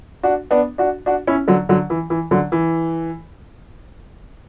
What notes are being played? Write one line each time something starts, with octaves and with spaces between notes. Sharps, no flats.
D4 F#4
B3 D4
D4 F#4
D4 F#4
C#4 E4
D3 F#3
D3 F#3
E3
E3
D3 F#3
E3